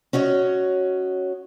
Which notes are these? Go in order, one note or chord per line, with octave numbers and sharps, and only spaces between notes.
C#4 F#4 C#5 D#5